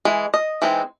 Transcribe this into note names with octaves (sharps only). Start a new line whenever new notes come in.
E3 G#3
D#5
E3 G#3 C4 D#4